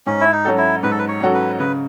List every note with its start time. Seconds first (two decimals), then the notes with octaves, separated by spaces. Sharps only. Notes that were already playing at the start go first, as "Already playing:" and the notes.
0.07 G#2 C#4
0.20 E4
0.32 D#4
0.45 F#3 C#4 F#4 A4
0.58 E4
0.83 G#2 B4
0.91 A4
0.99 B4
1.08 C#5
1.20 F#3 C#4 F#4 A4
1.34 B4
1.59 C#3 B4